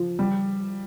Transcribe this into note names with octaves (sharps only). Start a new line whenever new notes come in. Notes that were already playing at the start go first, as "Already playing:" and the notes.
Already playing: F3
G3